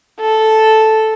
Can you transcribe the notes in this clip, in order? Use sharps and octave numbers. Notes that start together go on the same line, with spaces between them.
A4